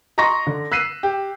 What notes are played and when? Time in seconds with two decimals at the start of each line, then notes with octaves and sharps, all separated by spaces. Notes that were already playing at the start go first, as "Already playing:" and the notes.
0.18 D#5 A#5 C6 C#6 A#6
0.47 D3
0.72 E6 F#6 B6 C7 D#7 E7
1.03 G4